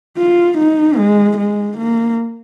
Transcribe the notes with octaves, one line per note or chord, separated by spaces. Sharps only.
F4
D#4
G#3
G#3
A#3